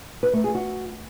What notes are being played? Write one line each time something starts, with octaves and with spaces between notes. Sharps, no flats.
B4
A3
G#4
F#4